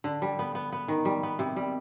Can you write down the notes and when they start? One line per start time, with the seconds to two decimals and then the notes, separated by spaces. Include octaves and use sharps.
0.04 D3
0.22 G3
0.39 B3
0.55 B3
0.72 B3
0.88 D#3
1.05 G3
1.23 B3
1.39 C3
1.57 G3